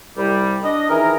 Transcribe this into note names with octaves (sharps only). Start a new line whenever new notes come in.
C2 G3
D4 D#5
D#3 E3 E4 G#4 A#4